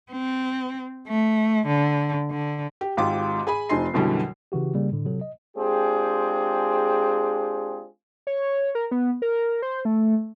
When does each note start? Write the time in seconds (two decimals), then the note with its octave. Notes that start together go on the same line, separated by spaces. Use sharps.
0.11 C4
1.07 A3
1.67 D3
2.30 D3
2.81 G4
2.97 G#1 G#2 F4 G4 D6
3.47 G#4 G#5 B5
3.69 F1 F3 D#4 G#5 C6 C7
3.94 B1 F#2 B2 D3 E3 G3
4.52 C#3 E3 F#4 G4
4.75 C#3 G3 A#3
4.92 A2 D3
5.05 C3 F#3 A4
5.21 D#5
5.57 G#3 C4 D4 F4 G4 G#4
8.27 C#5
8.75 A#4
8.91 B3
9.22 A#4
9.62 C5
9.85 A3